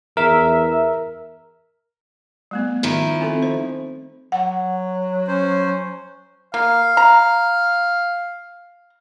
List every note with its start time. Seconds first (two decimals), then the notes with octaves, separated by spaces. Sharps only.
0.17 E2 A#4 E5
2.51 G3 A3 B3
2.83 D#3 F3 E4
3.21 C4 A4 C6
3.43 C5
4.32 F#3 F#5
5.28 C#4 C5
6.54 A#3 F5
6.97 A#5